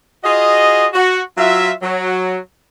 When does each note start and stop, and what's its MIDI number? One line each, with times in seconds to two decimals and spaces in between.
0.24 0.86 65
0.24 0.86 66
0.24 0.86 68
0.24 0.86 75
0.94 1.22 66
1.37 1.71 54
1.37 1.71 65
1.37 1.71 76
1.82 2.38 54